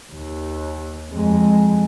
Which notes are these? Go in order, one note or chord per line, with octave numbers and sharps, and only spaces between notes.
D#2
F2 G#3